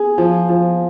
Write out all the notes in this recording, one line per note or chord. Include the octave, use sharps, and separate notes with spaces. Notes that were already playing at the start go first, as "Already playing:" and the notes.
Already playing: G#4
F3
F3